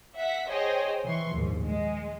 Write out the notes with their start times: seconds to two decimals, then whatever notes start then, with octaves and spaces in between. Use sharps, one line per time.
0.15 E5 F#5 B6
0.48 G#4 C5 C#5 D#5 G5
1.04 E3 C6 C#6
1.34 A#1 D#2 G#2
1.65 G#3